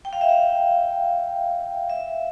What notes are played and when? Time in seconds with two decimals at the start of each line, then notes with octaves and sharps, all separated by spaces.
0.05 G5
0.13 F5
0.21 E5
0.29 F5
1.90 E5